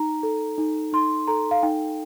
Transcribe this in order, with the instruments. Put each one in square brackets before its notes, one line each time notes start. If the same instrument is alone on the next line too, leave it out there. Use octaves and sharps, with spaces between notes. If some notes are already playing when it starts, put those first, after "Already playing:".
Already playing: [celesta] D#4 A#5
A4
D#4
D#4 C6
A4 A#5
F5
D#4 G5